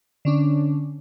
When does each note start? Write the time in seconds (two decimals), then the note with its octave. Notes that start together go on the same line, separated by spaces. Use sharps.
0.25 D3 C#4 D4